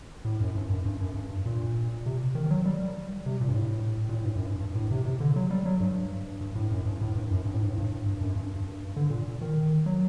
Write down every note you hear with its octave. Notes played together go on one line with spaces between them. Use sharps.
A2
F#2
G2
F#2
G2
F#2
G2
A#2
C3
D#3
D#3
F#3
G3
C3
A#2
G2
A2
A#2
A2
G2
F#2
G2
G2
A2
C3
C3
D3
F#3
G3
F#3
G2
G2
A2
F#2
G2
A2
G2
F#2
G2
A2
G2
A2
G2
G2
F#2
G2
G2
D3
A#2
D#3
F#3